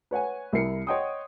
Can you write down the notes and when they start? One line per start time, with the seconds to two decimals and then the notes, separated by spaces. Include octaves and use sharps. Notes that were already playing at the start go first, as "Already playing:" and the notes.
0.11 B4 C#5 F#5 G#5
0.53 C2 E4 A#4 C7 C#7
0.87 C#5 D#5 F#5 G5 C6 D#6